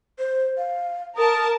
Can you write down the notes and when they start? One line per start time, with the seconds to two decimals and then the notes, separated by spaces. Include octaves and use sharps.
0.19 C5
0.58 F5
1.17 A#4 A5 D#6